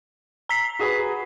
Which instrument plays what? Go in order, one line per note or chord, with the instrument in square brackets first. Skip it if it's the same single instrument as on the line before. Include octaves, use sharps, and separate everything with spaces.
[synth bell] A#5 B6 C7
[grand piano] F#4 G#4 B4